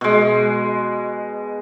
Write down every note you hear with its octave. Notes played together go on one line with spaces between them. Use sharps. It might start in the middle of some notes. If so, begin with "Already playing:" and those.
B2 G#3